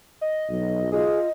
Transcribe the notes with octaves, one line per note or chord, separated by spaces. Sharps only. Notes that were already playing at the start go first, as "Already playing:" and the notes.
D#5
B1 F#3
F4 G#4 D#5